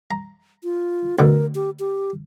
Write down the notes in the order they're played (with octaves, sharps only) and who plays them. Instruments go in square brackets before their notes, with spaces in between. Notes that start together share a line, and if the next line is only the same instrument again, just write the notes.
[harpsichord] A#5
[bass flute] F4
[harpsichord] D2 B2 D3 [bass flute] A#4
[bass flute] G4
G4